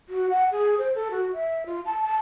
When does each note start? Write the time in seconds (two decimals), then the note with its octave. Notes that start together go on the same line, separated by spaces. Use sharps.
0.09 F#4
0.30 F#5
0.52 G#4
0.79 C5
0.95 A4
1.11 F#4
1.34 E5
1.66 F4
1.86 A5
2.03 A5